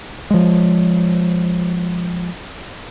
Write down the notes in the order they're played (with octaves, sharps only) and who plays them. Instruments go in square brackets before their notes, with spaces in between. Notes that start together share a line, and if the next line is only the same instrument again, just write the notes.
[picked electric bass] F3 G#3